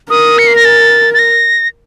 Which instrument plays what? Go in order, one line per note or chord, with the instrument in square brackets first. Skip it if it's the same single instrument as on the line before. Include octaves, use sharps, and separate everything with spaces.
[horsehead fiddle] A#4 [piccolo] D#6
[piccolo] C#7
C7
A#6
A6
A6
A#6